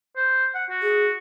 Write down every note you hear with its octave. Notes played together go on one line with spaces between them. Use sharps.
C5
F#5
F#4
G#4